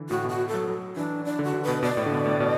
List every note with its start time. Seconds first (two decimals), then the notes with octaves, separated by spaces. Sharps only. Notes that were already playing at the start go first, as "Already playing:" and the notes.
Already playing: D3 E3
0.10 A2 F#4
0.25 B2
0.29 F#4
0.48 A4
0.54 F#3
0.68 F#3
0.96 E3 D4
1.25 D4
1.39 D3
1.44 F#4
1.54 D3
1.63 B2 B4
1.82 B2 D5
1.97 A2
2.06 D3
2.12 B2
2.25 A2
2.40 B2